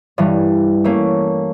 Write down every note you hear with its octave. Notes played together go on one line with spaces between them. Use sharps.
G2 E3 G3
A3 A#3 C#4